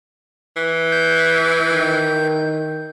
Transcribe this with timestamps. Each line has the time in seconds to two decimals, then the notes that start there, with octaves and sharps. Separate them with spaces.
0.56 E3
0.92 G6
1.72 D#3